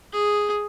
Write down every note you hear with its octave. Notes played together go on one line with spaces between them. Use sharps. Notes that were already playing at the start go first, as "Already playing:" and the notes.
G#4